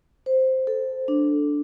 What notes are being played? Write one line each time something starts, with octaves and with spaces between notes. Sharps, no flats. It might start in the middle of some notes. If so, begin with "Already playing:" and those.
C5
A4
D4